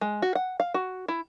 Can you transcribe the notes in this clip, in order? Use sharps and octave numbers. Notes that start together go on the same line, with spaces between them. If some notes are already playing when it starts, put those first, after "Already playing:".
G#3
F#4
F#5
F5
F#4
E4